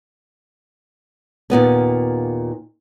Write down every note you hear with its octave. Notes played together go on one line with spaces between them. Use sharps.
D#2 A#2 B3 C#4